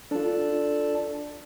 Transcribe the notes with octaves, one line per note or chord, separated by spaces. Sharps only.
D4 F4 A4 D5 A5